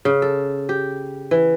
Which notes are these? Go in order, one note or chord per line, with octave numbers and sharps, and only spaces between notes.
C#3
A4
G4
E3